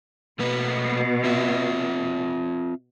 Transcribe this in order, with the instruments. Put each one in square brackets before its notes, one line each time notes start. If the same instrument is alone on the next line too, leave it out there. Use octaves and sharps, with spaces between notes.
[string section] B2 [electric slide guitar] A3 A#3 B4
[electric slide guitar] C4 F4 E5